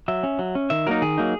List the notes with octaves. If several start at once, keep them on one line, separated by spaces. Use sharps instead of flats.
F#3 E5
C#4
F#3
C#4
D#3 E5
F#3 A#3 D#4 A#4
D#3 G#4
F#3 A#3 D#4